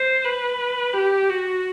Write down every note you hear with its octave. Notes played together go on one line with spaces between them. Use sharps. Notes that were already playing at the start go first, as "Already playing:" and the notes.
Already playing: C5
B4
G4
F#4